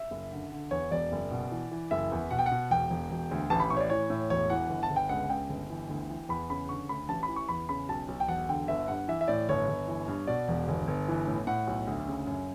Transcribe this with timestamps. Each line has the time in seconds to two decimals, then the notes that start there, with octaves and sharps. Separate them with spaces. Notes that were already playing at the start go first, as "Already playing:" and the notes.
Already playing: E5
0.11 F#1
0.32 D3
0.52 D3
0.71 E2 C#5
0.91 E1 D5
1.12 F#1
1.31 B2
1.52 E3
1.72 E3
1.91 F#1 E5
2.12 E2
2.31 B2 F#5
2.39 G5
2.46 F#5
2.51 B2
2.71 E1 G5
2.90 E1
3.10 E1
3.31 D2
3.50 A1 A5
3.60 B5
3.70 A2 C#6
3.77 C#5
3.80 D5
3.90 E3 C#5
4.10 A2
4.30 E1 C#5
4.50 E3 F#5
4.69 G1
4.83 A5
4.90 G1
4.96 G5
5.09 C#2 F#5
5.30 C#2 G5
5.50 G1
5.70 E3
5.89 D2
6.10 E3
6.29 E2 B5
6.50 C#3 B5
6.69 D3 C#6
6.89 D2 B5
7.09 A1 A5
7.23 B5
7.28 E3
7.36 C#6
7.49 E2 B5
7.69 C#3 B5
7.89 B1 A5
8.08 B1
8.20 G5
8.28 E1 F#5
8.49 D3 G5
8.68 G1 E5
8.88 G2 F#5
9.08 E3 E5
9.21 E5
9.28 A2 D5
9.49 G1 C#5
9.68 G1
9.88 E3
10.08 G2
10.27 B2 D5
10.48 E1
10.68 G1
10.88 G1
11.08 E3
11.28 A2
11.47 A2 F#5
11.67 B1
11.87 D2
12.08 C#3
12.27 F#2